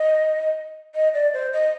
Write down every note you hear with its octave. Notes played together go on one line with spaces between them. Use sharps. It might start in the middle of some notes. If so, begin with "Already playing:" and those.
Already playing: D#5
D#5
D5
C5
D#5